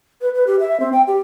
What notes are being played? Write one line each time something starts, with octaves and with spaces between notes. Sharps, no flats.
B4
B4
G4
E5
C4
G5
G4